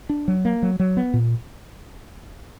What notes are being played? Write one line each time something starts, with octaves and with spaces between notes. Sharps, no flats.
D4
F#3
A#3
F#3
F#3
B3
A#2